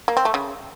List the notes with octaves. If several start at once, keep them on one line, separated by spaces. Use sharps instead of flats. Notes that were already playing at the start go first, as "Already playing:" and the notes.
A#3
C4
A3
C#3